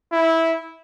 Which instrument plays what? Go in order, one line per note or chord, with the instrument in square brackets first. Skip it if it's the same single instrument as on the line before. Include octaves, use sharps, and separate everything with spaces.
[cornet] E4